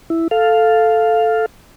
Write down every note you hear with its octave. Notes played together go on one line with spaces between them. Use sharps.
E4
A4 F5